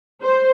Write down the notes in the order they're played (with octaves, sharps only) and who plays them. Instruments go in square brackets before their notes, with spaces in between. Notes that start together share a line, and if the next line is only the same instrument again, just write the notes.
[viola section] C5